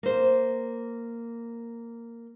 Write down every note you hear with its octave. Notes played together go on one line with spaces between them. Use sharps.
A#3 C5